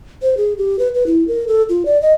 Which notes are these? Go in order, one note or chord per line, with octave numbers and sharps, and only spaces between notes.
C5
G#4
G4
B4
B4
E4
A#4
A4
F4
D5
D#5